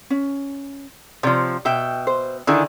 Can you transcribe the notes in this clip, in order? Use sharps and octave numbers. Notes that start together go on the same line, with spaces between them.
C#4
C3 F3 C#5 D5
B2 E5 G5
C5
D3 D#3 E4 G#4